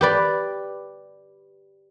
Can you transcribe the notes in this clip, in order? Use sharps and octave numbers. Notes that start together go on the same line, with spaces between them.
G4 B4 D5